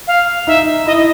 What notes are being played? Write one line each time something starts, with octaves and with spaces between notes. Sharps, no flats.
F5
D#4 E5
E4 D#5
D#5